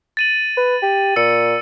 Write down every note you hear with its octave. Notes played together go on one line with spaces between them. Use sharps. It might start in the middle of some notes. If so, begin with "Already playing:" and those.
A6 D#7 F#7
B4
G4
A#2 E6 C#7